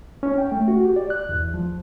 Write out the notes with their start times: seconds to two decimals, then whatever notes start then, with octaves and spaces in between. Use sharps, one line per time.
0.23 C#4
0.38 G5
0.52 A3
0.68 F#4
0.85 G4
0.96 D5
1.10 F#6
1.29 E2
1.54 F3